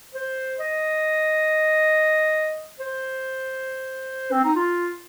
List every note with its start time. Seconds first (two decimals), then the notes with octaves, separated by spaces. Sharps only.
0.15 C5
0.59 D#5
2.80 C5
4.32 C4
4.44 D#4
4.56 F4